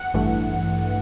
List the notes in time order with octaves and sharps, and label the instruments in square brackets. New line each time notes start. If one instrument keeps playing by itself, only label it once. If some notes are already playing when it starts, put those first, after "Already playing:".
Already playing: [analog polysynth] F#5
A1 G2 E3 A3